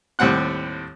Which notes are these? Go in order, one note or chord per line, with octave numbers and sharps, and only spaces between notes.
D#2 A2 G3 C4 F#5 F#6